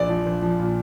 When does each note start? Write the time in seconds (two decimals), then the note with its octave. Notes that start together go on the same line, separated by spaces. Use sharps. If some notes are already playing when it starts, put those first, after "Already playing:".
Already playing: A#1 D5
0.09 F3
0.26 A#1
0.42 F3
0.59 A#2